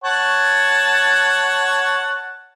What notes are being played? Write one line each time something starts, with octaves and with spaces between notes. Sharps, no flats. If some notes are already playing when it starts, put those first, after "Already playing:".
C#5 F#5 A5